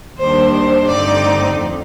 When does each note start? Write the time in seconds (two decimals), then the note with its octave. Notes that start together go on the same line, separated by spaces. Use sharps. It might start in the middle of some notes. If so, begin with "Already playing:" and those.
0.19 D#2 D#3 G3 D4 C5
0.52 C5
0.86 G2 D3 A3 C4 D#4 D5
1.53 F2